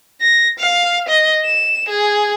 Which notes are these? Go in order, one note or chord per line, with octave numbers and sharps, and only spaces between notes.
A#6
F5
D#5
E7
G#4